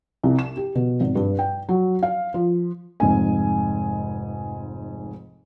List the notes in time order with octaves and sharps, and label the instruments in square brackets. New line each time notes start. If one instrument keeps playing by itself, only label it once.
[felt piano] C2
E7
G4
B2
G#1
G2
G5
F#3
F5
F3
F1 G#2 G#5